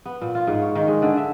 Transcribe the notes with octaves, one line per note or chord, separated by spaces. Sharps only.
B3
A#2
F4
G#2
C#5
D#3
G#3
D3
E5